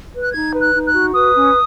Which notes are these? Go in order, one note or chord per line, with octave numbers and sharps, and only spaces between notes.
B4
F#6
D#4 G#6
B4
F#6
D#4
F#6
F#4
B4 D#6
C#4